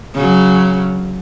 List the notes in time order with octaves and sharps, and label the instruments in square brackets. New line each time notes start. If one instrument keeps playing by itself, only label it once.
[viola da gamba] C#3 F#3